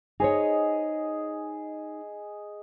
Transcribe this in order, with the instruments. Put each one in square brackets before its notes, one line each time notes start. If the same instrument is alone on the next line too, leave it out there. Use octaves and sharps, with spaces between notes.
[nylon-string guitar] D#4 C5 C#5 [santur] G#4 D#5